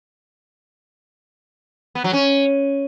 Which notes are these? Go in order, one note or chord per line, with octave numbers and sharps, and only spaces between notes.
B3
F#3
C#4